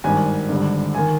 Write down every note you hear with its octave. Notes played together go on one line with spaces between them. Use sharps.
G#1 G2 D#3 G#5
G#1 G2 D3
D#3 G#5